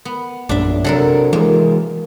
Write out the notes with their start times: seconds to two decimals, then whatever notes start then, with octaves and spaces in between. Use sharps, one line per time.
0.05 B3
0.49 A#1 F#2 D4 E5
0.84 C3 F#3 D4 A4 A#4
1.33 E3 G#3 A#3